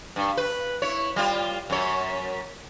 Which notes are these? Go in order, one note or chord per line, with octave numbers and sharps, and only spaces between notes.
G2
B4
E4 C#5
G3 F4
F#2 C#5